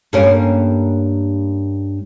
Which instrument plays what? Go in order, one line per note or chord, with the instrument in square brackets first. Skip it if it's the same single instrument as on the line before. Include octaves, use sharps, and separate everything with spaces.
[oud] G2 A#3 C#4